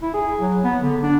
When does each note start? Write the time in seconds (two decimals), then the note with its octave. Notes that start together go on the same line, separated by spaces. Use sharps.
0.02 E4
0.14 G#4
0.41 F#3
0.64 B3
0.82 D3
1.03 D4